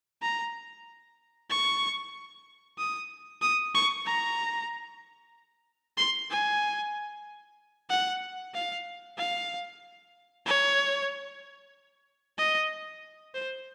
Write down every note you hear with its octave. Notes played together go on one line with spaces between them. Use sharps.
A#5
C#6
D#6
D#6
C#6
A#5
C6
G#5
F#5
F5
F5
C#5
D#5
C5